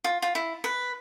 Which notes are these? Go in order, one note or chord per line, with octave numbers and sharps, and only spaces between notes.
F4
F4
E4
B4